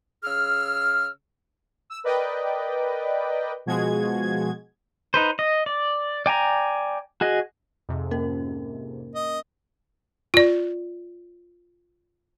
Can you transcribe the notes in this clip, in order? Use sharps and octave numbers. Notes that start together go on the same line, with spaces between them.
C#3 G#4 E6 F6
E6
A#4 B4 D5 D#5 G5
B2 F3 G#3 F#4 G#4 G#6
D#4 B4 C5
D#5
D5
D5 G5 G#5 A#5
F#4 G#4 D#5
F2 G#2 C3
A#3 C#4 A#4
D#5
F4 D5